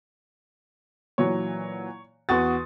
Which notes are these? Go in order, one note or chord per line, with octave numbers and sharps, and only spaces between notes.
A#2 E3 F#3 C#5
E2 F#4 C6 C#6 D#6 A6